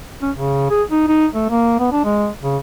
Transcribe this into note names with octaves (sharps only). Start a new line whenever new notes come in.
C#4
C#3
G#4
D#4
D#4
A3
A#3
B3
D4
G#3
C#3